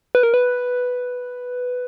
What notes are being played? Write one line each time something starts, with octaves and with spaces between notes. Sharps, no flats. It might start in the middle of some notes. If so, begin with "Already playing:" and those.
B4
A#4
B4